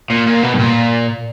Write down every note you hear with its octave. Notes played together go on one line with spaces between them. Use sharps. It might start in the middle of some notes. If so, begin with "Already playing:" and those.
A#2
A#2
B2
G2
A#2